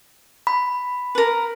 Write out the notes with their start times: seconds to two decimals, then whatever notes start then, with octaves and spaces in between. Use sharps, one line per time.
0.47 B5
1.15 A#4 B4